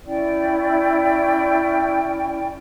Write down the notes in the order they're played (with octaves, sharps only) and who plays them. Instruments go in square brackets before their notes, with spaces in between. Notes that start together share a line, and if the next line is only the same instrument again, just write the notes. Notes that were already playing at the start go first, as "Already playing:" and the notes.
[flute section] C#4 E4 D5 G5